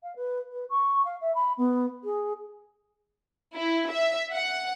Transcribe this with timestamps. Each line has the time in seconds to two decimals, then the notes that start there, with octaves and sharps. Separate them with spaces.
0.03 F5
0.16 B4
0.52 B4
0.70 C#6
1.05 F5
1.21 E5
1.35 B5
1.57 B3
2.04 G#4
3.55 E4
3.91 E5
4.33 F#5